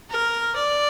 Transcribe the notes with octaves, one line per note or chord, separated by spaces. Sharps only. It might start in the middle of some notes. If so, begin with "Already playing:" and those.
A#4
D5